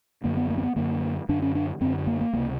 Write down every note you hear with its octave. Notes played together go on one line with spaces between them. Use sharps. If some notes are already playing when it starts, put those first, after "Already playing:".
F#2 D3 A#3
B3
A#3
C4
B3
F#2 D3 A#3
F#2 D3 D4
C#4
D4
F#2 D3 C4
A#3
A#3
C#2 C3 A#3